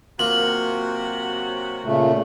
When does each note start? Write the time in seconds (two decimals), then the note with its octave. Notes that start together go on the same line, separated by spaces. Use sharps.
0.19 C3 F#3 A#3 F4 F#4 F#7
1.84 A#2 C#3 A3